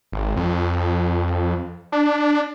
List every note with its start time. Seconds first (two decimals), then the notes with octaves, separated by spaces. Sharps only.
0.12 G#1
0.36 F2
1.92 D4